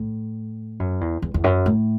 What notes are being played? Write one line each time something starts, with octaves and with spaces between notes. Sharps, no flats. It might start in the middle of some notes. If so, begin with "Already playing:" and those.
Already playing: A2
F#2
E2
E2
E2
F#2
A2